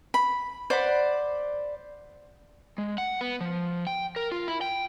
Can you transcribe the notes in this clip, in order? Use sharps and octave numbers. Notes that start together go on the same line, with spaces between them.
B5
C5 D5 F#5 B5
G#3
F#5
B3
F3
G5
A#4
F4
E4
G5